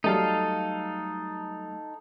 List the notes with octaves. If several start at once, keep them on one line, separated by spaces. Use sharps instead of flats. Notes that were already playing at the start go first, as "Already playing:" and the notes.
F#3 G3 A3 D#4 A4 F5